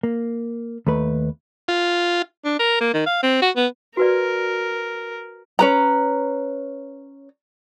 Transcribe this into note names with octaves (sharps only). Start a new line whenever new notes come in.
A#3
D#2 A3 B4
F4
D4
A#4
A#3
D#3
F5
C4
F#4
B3
F#4 A#4 B4 D5
C#4 B4 A#5